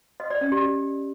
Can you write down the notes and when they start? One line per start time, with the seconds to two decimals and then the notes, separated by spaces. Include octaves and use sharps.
0.20 D#5
0.30 D5
0.41 C#4
0.52 G4